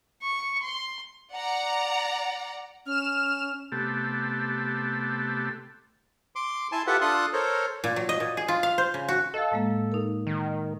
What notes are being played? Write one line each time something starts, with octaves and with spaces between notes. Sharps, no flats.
C#6
C6
D5 F#5 A#5
C#4 F6 E7
C3 A3 B3 G4 A4
C6 D6
E4 G#5 A5 C6
F4 G4 A4 B4 E5 F#5
D4 F4 A4 C6 D#6 F#6
A4 A#4 C5 C#5
A#2
F#3
D#5
A#2
G#4
F4
F5
C5
C#3
F#4
A4 D#5 F5
A2 G#3 A#3
D#4 A#4
D#3